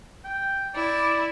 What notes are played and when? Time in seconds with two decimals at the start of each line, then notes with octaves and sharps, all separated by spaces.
0.25 G5
0.75 E4 D5